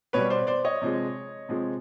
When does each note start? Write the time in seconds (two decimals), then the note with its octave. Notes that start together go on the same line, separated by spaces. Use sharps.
0.13 B2 G3 B4 C#5
0.30 C5 D5
0.47 C5 D5
0.65 C#5 D#5
0.82 C3 F3 G#3
1.49 C3 F3 G#3